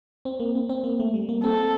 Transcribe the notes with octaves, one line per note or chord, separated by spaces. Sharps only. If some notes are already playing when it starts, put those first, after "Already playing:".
C4
A#3
C4
C4
A#3
A3
G3
A#3
C4 A4